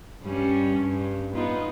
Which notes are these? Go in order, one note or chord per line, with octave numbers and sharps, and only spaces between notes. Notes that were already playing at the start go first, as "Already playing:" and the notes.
G2 G3 C#4
G2
B3 D#4 F4